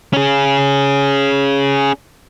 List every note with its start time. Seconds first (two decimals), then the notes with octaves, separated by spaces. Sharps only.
0.13 C#4 G#4